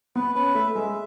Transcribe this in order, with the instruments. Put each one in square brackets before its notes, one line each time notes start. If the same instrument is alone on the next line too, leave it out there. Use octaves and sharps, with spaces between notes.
[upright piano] B3 [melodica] B4
[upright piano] C#4 [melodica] B4
[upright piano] A3 [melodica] E5
[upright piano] G#3 [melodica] E5